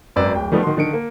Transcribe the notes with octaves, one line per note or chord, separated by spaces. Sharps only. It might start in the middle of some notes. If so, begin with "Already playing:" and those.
G#1 F#2 B4 D5 E6
D1 G5
D#3 F3 G3 A3 B3
D#3 F#4 C6
D3 D#3 C#7 D7
A#3